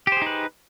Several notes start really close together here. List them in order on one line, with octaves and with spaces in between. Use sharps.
G4 C5 G#4 D#4 B4